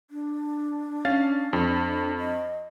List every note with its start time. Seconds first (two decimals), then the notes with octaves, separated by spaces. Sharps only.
0.11 D4
1.05 C#4 F5 A6
1.53 F2
2.19 D#5